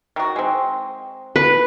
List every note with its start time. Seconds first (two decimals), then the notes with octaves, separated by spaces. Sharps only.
0.16 D#3 F#4
0.36 G#3 C4
1.36 B4